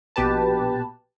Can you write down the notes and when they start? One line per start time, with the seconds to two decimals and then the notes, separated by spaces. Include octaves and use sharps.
0.16 A#1 B2 G4 B4 A5